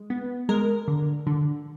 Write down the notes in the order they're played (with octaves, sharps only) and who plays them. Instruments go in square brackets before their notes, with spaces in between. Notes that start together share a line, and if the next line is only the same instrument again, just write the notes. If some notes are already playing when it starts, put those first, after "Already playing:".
Already playing: [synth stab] G#3
B3
G#3 A#4
D3
D3